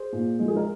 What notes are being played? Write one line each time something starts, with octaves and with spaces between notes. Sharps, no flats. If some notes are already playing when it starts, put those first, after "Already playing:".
Already playing: G#4 C5
A#2
F3 G#3
G#4
A#4